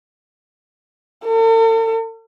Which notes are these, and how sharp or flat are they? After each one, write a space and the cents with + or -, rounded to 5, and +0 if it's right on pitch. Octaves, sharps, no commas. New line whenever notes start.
A4 +45